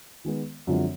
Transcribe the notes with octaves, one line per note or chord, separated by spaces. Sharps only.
D#3 G#3 B3
F#2 D3 F3 G#3 C4